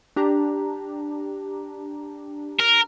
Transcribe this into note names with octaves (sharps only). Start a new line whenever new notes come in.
D4 G4 A#5
A#4